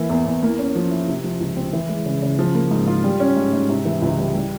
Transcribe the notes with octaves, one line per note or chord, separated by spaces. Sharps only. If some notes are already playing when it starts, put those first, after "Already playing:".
Already playing: E3 A#3
E2
E2
A#3
C#4
F3
E4
C3
F3
C#2
C4
E3
G#3
C#3
C#3
F3
A#3
G#2
F4
G3
C#4
G#2
G#2
C3
E3
C#2
G3
G3